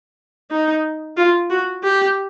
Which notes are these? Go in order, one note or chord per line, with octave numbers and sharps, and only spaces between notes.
D#4
F4
F#4
G4